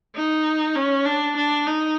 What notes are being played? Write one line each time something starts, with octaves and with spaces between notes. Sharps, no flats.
D#4
C#4
D4
D4
D#4